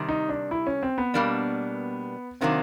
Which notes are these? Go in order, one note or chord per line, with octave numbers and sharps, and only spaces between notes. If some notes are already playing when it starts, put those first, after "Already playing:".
Already playing: C3 D#3 G3
D#4
D4
E4
C#4
C4
B3
B2 G3 A#3 D4
C3 D#3 F#3 A#3 C4 D4